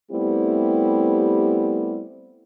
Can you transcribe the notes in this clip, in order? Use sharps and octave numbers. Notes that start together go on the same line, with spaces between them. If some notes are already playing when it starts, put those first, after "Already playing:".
G3 A3 B3 C4 E4 G4